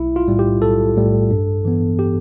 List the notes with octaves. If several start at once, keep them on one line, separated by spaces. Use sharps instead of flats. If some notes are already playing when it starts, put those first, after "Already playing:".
Already playing: B1 E4
F4
A2 G3
G4
B1 A4
A2 G3
G2
E3 B3
G4